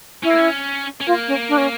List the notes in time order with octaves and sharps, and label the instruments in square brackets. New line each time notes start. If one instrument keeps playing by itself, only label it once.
[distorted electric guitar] C#4 [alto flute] E4
[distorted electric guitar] A#3
C#4
C#4
[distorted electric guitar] A#3 [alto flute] F4
[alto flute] C#4
D4
C#4